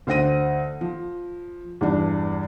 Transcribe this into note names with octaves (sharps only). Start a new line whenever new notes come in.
D2 C5 F#5 A#6 D#7
F3
E2 G2 D4